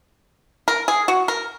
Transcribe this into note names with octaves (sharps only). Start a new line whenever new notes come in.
A#4
G#4
F#4
A#4